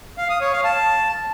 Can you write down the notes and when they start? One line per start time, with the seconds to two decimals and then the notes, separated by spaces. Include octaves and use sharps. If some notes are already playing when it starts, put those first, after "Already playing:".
0.18 F5
0.29 D#6
0.41 C#5
0.53 F5
0.64 A5